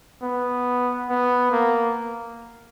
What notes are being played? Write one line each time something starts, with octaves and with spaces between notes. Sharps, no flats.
B3
B3
A#3